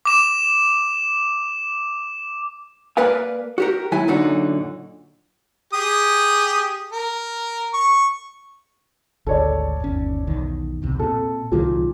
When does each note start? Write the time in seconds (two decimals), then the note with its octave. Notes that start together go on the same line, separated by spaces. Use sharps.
0.05 D6 E7
2.97 A#3 A#4 B4 D5 F5 G#5
3.58 F#4 G4 A#4
3.92 D#2 F#3 E4 G#5
4.08 F#2 A#2 D3 D#4 F#4
5.74 G4 G#4 D#6
6.92 A#4
7.74 C#6
9.27 G#1 D2 A4 C#5 D5
9.80 G1 D#2 C#4
10.27 B1 E2 D#3
10.82 B1 E2 C3
10.99 A#2 C4 A4
11.52 C2 A#2 D#3 F#3